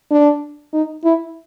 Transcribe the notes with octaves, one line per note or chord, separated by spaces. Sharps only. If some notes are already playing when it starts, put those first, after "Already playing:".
D4
D#4
E4